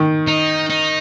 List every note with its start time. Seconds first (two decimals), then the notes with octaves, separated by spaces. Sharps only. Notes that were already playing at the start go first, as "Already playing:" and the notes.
Already playing: D#3
0.27 D#4
0.70 D#4